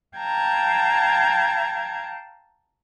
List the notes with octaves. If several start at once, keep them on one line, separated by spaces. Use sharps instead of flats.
F5 G5 A5 A#5 G#6